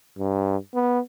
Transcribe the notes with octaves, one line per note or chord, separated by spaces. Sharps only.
G2
B3